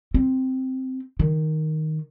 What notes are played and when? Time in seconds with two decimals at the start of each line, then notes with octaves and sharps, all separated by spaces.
0.14 C4
1.19 D#3